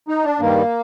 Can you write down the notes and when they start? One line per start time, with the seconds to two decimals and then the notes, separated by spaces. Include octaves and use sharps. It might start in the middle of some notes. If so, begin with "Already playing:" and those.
0.08 D#4
0.24 D4
0.40 G2 D#3 G3 A#3